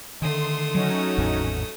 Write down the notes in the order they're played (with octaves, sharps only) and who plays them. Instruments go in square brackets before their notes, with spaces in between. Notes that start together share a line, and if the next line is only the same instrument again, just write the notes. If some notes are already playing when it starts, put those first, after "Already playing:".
[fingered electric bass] D3 D#3 [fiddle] A3 D#6 [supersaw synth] C6
[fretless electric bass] F#3 [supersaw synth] C#4 D#4 F#4
[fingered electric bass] G#1 E2 A2